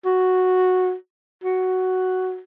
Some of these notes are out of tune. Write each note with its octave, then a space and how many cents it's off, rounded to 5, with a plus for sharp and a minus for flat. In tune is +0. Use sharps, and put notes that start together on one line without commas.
F#4 -5
F#4 +5